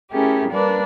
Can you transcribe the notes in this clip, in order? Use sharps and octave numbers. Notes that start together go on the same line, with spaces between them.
A3 C#4 E4 G4 G#4 A#4
G3 A#3 D4 A#4 B4 D5